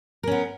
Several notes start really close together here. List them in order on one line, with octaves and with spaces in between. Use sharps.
A#4 C#4 B3